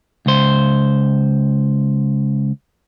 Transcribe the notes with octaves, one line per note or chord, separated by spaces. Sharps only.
C#2 C5